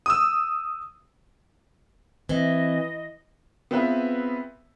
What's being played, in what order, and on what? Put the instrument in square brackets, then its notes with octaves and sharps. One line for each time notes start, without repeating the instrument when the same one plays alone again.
[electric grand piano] D#6 E6
[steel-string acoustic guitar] E3 [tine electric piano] C4 [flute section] D#5
[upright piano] B3 C4 F4 G#4 B4 E5